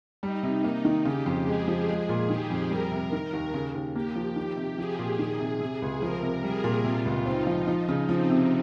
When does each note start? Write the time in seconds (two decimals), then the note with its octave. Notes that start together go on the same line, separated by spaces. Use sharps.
0.23 G3 D#4
0.43 C3
0.64 A#3
0.85 D#3
1.05 C#3 G4
1.26 F2
1.46 G#3 G#4
1.68 F3
1.88 G#3 G#4
2.09 A#2
2.29 D#3 G4
2.50 F2
2.71 G3 A#4
2.92 C3
3.12 D#3
3.33 D#2
3.54 C#3
3.75 D#2
3.95 A#3 G4
4.15 F3
4.36 D#3
4.57 C3
4.78 F3 G#4
4.99 A#2
5.19 D#3 G#4
5.40 C3
5.61 C3
5.82 C#2
6.02 F3 A#4
6.23 C3
6.43 G3 G#4
6.64 A#2
6.84 C3 F4
7.05 C#2
7.26 C4 D#4
7.47 F3
7.67 F3
7.88 C#3
8.09 F3 C4
8.30 C3